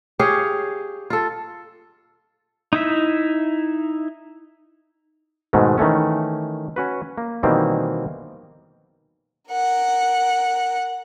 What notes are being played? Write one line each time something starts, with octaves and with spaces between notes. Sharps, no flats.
G4 G#4 C#5 F5
F4 A4
D#4 E4 E5
G#2 B2 D#3 G#3 A3
D#3 E3 A3 C#4
C#4 F#4 B4
A#3
B2 D#3 E3 G3 A#3 C4
A#4 F#5